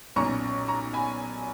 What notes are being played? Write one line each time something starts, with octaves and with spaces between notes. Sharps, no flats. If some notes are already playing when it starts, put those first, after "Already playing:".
B1 A#2 A#3 C#4 A#5 C#6
A#5 C#6
G#5 B5